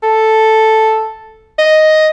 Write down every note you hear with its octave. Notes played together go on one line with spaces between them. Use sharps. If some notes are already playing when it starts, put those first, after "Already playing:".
A4
D#5